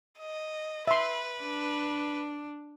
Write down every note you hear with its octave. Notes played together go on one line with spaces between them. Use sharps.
D#5
B4 E5 C6
D4